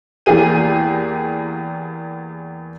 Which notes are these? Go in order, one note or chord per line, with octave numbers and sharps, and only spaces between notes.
E2 A#3 G4 G#4 D#7